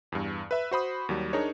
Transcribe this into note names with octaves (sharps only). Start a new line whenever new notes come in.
E2 G2
B4 E5 B5
F#4 C5 B5 D#6
D#2 F#3 G3
D4 D#4 G#4 A#4 C#5